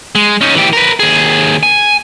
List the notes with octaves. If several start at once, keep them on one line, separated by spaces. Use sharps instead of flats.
G#3
C#4 D#4
E3 G4
A#4 B4
D#2 G#4
G#5